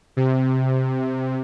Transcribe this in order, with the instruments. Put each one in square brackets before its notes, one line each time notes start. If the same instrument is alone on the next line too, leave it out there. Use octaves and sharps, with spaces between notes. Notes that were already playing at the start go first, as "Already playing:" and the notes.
[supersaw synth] C3